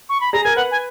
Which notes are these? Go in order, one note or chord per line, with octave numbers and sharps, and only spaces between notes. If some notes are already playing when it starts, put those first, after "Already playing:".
C#6
B5
G#4 A#5
A#4 G#5
B4 F#5
G#5